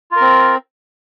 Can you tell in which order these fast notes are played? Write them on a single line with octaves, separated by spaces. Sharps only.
F4 A#4 C4